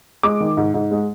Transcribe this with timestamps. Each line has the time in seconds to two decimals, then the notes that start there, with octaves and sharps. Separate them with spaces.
0.23 G#3 D6
0.40 D#3
0.57 G#2
0.74 G#2
0.91 G#3